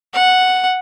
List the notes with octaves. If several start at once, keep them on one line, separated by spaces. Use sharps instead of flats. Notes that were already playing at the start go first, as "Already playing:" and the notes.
F#5